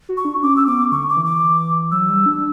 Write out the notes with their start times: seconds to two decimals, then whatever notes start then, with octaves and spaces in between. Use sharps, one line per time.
0.09 F#4
0.17 C#6
0.25 D4
0.43 C#4 D6
0.57 E6
0.67 B3 D6
0.92 D3 C#6
1.09 D6
1.17 E3
1.26 D6
1.91 F#3 E6
2.09 G3
2.26 D4